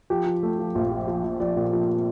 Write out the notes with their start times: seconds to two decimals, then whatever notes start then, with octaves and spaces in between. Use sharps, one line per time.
0.10 F3 G4
0.26 F3
0.43 A3
0.59 F3
0.75 A#1 F4
0.91 F3
1.08 F3
1.24 F3
1.40 F3 D5
1.56 A#2
1.73 F3